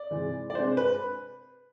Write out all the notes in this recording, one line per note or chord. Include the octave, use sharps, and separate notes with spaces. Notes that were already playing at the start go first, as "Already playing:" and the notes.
Already playing: D5
C3 E3 G#3 C4
D5
C3 G#3 D4 C5
B4